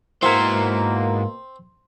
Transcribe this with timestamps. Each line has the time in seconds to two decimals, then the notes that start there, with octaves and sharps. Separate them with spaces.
0.23 G#2 B2 A#3 C4 E4 F#4 A#4 C5